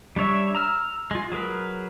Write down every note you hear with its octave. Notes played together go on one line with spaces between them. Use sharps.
G3 D4 C#5 E5
A#5 E6 F6
G#3 F4
F#3 G#4 A#4 B4